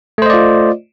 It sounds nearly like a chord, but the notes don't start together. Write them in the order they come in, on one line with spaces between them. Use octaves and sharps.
A3 C5 D#5 D5 F4